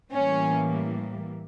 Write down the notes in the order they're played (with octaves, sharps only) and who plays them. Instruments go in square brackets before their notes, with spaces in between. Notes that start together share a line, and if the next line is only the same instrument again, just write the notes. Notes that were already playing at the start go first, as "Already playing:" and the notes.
[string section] A2 E3 G3 A#3 C#4